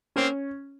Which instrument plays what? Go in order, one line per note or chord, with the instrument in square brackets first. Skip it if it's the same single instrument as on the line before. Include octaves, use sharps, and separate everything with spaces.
[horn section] A#3 C4 [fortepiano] C#4